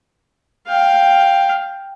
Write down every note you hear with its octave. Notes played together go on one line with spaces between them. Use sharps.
F5 G5